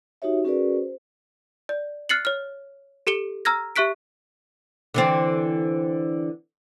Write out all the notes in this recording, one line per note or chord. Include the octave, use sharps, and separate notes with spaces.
D#4 F#4 G4 C#5 E5
C#4 F#4 G#4 A#4 B4 D5
C5
D5
F6 F#6 A6 C7 C#7 F#7
C#5 F6
G4 A4 C#7 G7
A#5 E6 F6 G#6 A#6
G4 E5 C#6 F#6 B6 D7
D3 E3 C4